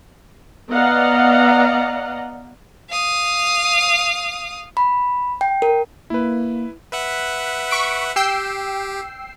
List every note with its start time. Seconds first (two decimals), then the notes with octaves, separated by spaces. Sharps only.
0.71 B3 D5 D#5 F5 F#5 A#5
2.90 F5 D#6
4.77 B5
5.41 G5
5.62 A#4
6.10 A#3 E4 B4
6.92 B4 E5 F#5
7.71 C#6 B6 D7
8.16 G4 G5 E6 C7